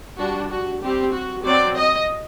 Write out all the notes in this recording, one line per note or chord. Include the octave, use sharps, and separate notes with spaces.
G3 D4 F#4
F#4
G3 C4 G4
F#4
F#3 C4 D5
D#5